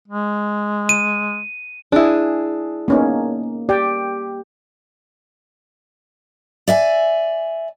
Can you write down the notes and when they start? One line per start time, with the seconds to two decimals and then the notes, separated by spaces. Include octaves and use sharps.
0.08 G#3
0.89 D#7
1.92 D4 E4 G#4
2.88 A#3 B3 C#4 D#4
3.69 G4 D5 G5
6.68 D5 E5 G#5